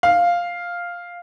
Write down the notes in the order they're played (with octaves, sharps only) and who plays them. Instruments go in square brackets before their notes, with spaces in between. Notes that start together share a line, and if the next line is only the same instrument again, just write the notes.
[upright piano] F5